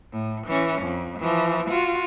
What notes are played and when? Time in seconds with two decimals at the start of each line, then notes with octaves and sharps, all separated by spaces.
0.12 A2
0.47 E3 C#4
0.82 F2
1.19 E3 F3
1.70 F4 F#4